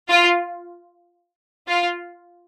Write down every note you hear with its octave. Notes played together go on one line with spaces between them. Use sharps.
F4
F4